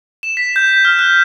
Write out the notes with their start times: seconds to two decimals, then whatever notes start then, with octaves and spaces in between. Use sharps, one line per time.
0.23 E7
0.37 B6
0.56 G6
0.85 F6
0.99 F#6